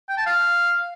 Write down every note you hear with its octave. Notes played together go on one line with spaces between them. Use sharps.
G5
A5
F5